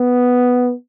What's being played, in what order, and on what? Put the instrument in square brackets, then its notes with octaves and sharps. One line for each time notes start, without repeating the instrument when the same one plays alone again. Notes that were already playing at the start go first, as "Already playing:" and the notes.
Already playing: [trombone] B3